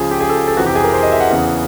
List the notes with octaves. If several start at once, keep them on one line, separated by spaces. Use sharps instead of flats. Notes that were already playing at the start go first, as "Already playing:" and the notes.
Already playing: C#2 C#3 F3 G#4
G4
G#4
A4
A4
F1 F2 C3 E3 F#4
G4
G#4
A#4
C5
D#5
E5
F#5
E2 C#3 E3